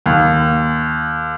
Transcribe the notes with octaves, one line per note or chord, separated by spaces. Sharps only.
D#2